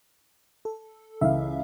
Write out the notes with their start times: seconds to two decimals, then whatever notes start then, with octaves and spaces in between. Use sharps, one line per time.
0.65 A4
1.21 C#2 E3 E5 F5